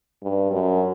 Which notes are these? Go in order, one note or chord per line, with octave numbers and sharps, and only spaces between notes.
G2
F#2